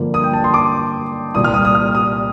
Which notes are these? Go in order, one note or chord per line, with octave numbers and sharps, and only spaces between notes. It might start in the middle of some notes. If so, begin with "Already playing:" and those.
Already playing: G2 D3 F3 A#3
D#6
G5
A5
C6
D6
C2 A#2 G3 D#6
F6
D#6
D#6
F6
D#6